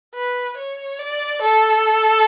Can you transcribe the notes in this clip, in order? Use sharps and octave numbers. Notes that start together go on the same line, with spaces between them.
B4
C#5
D5
A4